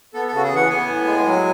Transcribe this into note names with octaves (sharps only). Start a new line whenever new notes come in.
B3 A4
A4
C#3 F#4
G#4
E3 F#5
B3 G#5
A2
G#3
F#3